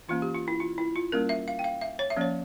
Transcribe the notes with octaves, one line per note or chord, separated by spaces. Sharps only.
E3 A#3 C#4 F4
G4
F4
E4
F4
E4
F4
G3 A#3 C#4 A#4
E5
F5
G5
F5
E5
C#5
E5
F3 A#3 C#4 C#5